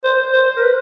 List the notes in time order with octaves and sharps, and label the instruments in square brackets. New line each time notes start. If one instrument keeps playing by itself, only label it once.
[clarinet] C5
C5
A#4
B4